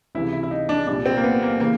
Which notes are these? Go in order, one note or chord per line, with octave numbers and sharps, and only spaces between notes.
C#2 C3 E3 E4
E4
E4
D#4
D4
C2 A#2 D4
C4
A#3
B3
A#3
C#3 E3 A#3